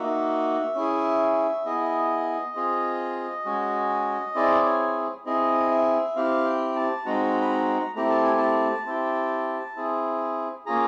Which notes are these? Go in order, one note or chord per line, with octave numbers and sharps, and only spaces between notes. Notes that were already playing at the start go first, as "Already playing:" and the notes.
Already playing: A#3 D#4 F#4 E5
C#4 E4 G#4
B3 E4 G#4 D#5
C4 F4 G#4
G#3 C#4 F#4
C4 E4 G#4 D5
C#5
C4 E4 G#4 D#5
E5
C4 E4 G4 F5
G5
A5
G#3 C4 D#4 F#4 A#5
B5
A#5
A3 C4 E4 G4 A#5
A5
G#5
A5
C4 E4 G4
C4 E4 G#4
A#3 C#4 F4 G#4 A#5